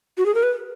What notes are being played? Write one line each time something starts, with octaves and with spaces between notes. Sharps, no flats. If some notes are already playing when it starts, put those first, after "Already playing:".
F#4
G#4
A#4
B4